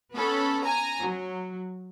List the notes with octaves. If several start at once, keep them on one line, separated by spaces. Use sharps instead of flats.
B3 C#4 A4 B5
G#5 A#5
F#3